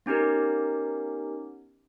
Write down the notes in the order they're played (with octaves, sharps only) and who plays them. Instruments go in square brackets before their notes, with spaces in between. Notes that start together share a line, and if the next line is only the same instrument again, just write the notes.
[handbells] B3 C#4 D#4 G4 A#4